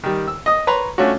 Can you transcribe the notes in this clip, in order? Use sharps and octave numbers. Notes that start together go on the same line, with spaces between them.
D#3 G3
E6
D#5 D#6
B4 C#5 A#5 C6
A3 C#4 D4 F4 F#4